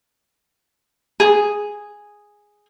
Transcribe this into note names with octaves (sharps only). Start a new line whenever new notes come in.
G#4